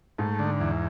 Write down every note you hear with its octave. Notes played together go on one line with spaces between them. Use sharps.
G#2 A3
D3
E2